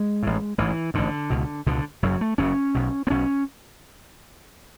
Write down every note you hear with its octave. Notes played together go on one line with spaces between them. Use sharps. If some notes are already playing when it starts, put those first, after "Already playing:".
Already playing: G#3
A1 A2
A1 G#2 E3
A1 G#2 D3
C#2 B2
C#2 B2 D3
F#1 F#2 C#3 F#3
A3
F#1 F#2 C#3 C#4
B1 B2
B3
B1 B2 C#4